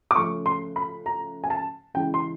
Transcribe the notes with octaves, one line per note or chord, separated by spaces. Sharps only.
D6
C#3 F3 A3 C#4 C#6
C6
B5
A#5
G#5
A5
C#3 E3 G#3 G5
C6